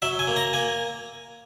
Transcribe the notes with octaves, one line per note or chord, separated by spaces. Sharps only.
F#3 E5
G#5
A#3
A#5
A#3 G#5